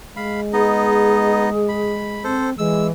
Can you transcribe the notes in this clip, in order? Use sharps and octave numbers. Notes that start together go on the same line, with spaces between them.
G#3 F5 B5
B3 D#4 G#4 D#5
B5
C4 A4 C5
E3 G#3 E6